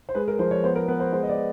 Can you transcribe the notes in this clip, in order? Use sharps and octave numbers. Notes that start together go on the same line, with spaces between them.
C5
G#3 B4
A#4
F3 C5
C#5
B3 C5
A#4
B3 B4
C5
G#3 C5
D#5
D5